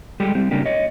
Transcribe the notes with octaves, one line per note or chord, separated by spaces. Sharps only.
G3 G#3 G4 A4
G3 C4
C#3 G3 A#3 D4 G4
C#5 D#5